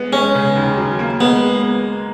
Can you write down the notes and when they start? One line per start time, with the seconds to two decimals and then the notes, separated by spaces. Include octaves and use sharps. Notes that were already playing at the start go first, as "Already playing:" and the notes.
Already playing: G#3 B3
0.12 G#3 C#4
0.35 C#3
0.56 D#2
0.77 F#3
0.99 A#3
1.21 G#3 B3